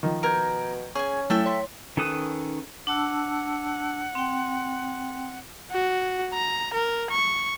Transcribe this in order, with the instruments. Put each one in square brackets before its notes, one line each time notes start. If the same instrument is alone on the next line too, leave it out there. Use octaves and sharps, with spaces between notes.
[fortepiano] D#3 F3
[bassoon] B2 [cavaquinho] A#4 A#5 [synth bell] G6 G#6 D7
[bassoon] C#4 [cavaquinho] G#4 G#5 [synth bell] C#6
[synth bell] F#3 A3 E4 [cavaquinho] A4 E5 G5
[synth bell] C#5 C6 B6
[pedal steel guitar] D#3 C#4 A4 B4 D#6
[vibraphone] D4 A5 E6 [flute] F#5
[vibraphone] C4 G5
[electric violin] F#4
A#5
A#4
C#6